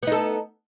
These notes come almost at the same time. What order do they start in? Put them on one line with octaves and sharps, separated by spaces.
B3 D#4 A4